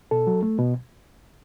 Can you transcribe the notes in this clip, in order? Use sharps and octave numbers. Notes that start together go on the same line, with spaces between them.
B2 A4
F#3
A3
B2